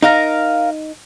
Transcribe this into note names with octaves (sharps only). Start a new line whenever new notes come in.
D#4 A#4 F5 A#5